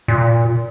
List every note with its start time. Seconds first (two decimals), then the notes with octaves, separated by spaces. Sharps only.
0.08 A#2